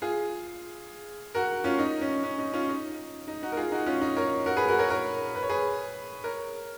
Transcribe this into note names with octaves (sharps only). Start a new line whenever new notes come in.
F4 G#4
F#4 A#4
C#4 F4
D#4
C#4
C#4
D#4
C#4 F4
D#4
D#4
D#4 F#4
A#4
F4 G#4
D#4 F#4
C#4 F4
D#4
A#4 C#5
F#4 A#4
G#4 B4
F#4 A#4
A#4 C#5
A#4 C#5
B4
C#5
G#4 B4
A#4 C#5